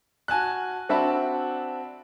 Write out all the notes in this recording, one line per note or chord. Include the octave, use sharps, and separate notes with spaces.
F#4 G#5 A5 F#6
C4 D4 F#4 E5 A5 B5